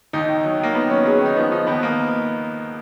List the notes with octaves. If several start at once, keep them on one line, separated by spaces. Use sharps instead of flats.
D#2 D#4
D#3
F#3
D#3 A#3
D#3 B3
F#3 C#4
F#3 G#4
C#4
D#3 D#4
F3 B3
F3 D#4
D#2 B3
A#3